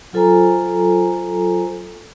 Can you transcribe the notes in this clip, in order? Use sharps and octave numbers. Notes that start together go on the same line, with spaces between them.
F#3 F4 A4 C5 G#5 A#5